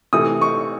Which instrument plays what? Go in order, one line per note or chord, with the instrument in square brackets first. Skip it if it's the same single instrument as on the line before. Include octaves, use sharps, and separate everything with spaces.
[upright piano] C3 E3 A3 D#6
C#6